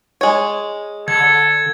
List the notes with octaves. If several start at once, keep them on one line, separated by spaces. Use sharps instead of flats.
G#3 C#5
D3 A4 G#6